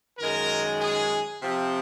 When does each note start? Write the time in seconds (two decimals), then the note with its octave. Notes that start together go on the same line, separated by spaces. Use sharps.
0.18 F#2 D#3 G#3 A#4
0.79 G#4
1.40 C3 F3 C4